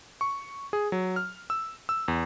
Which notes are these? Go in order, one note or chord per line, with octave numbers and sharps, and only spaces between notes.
C#6
G#4
F#3
F6
E6
E6
E2